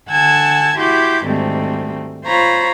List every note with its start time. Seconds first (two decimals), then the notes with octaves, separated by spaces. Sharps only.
0.11 D3 F#5 G#5 A5 E6 G#6
0.79 E4 F#4 G4 C6 D6 G6
1.25 D2 G#2 D#3 G3 A3 C4
2.25 F4 C5 C#5 A#5 B5